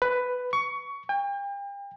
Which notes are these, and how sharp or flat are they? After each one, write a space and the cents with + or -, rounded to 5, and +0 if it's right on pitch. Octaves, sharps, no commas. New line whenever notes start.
B4 +10
C#6 +20
G5 +40